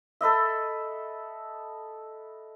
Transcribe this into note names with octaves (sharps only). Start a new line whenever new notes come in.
A4 B4 D#5 E5